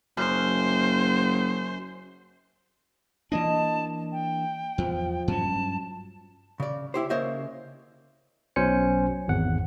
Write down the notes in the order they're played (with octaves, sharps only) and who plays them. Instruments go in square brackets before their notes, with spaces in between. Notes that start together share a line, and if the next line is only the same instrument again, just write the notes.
[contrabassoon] F#1 [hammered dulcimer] F#2 [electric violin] C5
[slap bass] E3 A#3 D4 [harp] D#5 [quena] A5
[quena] G5
[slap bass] E2 [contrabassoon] F3
[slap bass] G2 F#3 C#4 [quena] A5
[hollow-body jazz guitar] C#3 D5
E4 G4 C5
C#3 A#3 C5 C#5 D#5 E5
[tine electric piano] B1 B2 C#4 C5 G#5 C#7
G#1 E2 F#5